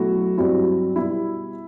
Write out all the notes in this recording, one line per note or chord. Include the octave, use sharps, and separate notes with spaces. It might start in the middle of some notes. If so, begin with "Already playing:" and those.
Already playing: B2 F#3 A3 E4 F#4
G2 F#3 C4 E4
B2 G3 B3 E4